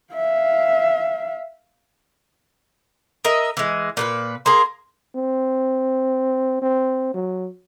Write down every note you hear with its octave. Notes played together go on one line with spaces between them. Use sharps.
E5 F5
A#4 D#5 E5
E3 G#3
A#2 F4 B4
A#3 G#4 C6
C4
C4
F#3